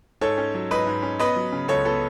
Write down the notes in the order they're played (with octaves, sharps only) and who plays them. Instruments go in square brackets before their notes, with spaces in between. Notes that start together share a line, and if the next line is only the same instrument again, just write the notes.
[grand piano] G#2 A4 C#5
C#4
F#3
G#2 B4 D#5
G#2
C#4
B3 B4 D#5
F#3
C#3
C#2 A4 C#5
B3 A4